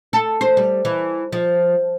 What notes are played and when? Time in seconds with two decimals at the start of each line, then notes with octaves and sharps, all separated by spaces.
0.13 A4
0.41 C5
0.57 G3
0.85 E3
1.32 F3